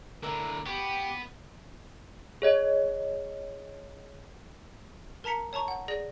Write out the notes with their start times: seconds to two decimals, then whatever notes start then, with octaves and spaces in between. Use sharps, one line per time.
0.23 A2 D3 A#4 E5
0.66 B3 G4 C#6
2.42 G#4 C#5 D#5
5.24 A#4 A5 A#5 B6 C#7
5.53 C#5 A5 A#5 C#6
5.68 F#5
5.88 G#4 D5 A#6